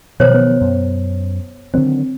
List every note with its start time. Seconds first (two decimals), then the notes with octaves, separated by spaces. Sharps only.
0.20 B2 D#3 F3 F#3 C5 C#5
0.34 B3
0.61 F#2
1.74 D3 D#3 F#3 C4